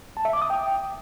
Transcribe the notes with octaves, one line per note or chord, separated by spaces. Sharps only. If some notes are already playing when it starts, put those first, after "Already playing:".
A5
E5
D6
D#6
G5